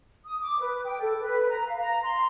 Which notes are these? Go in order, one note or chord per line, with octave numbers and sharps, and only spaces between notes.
D#6
D6
B4
G5
A4
B4
A#5
F5
A#5
C6